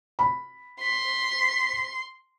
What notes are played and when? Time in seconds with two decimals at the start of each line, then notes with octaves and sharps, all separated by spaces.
0.19 B5
0.81 C6 B6